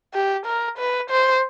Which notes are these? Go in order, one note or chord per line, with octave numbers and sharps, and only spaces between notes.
G4
A#4
B4
C5